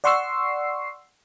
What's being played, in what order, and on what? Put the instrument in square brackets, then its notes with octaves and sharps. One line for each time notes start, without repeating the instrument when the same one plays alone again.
[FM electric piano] D5 F#5 C6 C#6 E6 C7